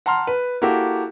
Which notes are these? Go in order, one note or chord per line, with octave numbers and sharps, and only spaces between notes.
F#5 A5 A#5 C6 F6
B4
A#3 E4 F#4 G4 A4